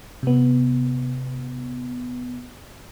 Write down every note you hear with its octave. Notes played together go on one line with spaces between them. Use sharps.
C3 B3